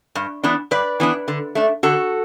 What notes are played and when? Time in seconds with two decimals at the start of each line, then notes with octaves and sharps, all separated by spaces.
0.15 G2
0.44 E3 B3 D4
0.71 G2 B4 D5
1.00 E3 B3 D4
1.28 D3
1.55 A3 D4
1.83 D3 F#4 A4